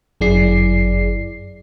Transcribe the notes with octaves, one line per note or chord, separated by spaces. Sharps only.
G1 F#2 E4 G#4 D5 C7